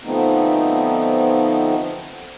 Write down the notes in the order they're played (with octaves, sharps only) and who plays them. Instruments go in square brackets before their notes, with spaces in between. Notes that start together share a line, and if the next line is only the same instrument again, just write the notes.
[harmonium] D3 F3 A3 B3 C4 D#4